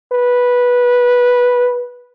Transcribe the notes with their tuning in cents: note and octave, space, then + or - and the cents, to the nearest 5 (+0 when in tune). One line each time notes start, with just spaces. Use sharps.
B4 -10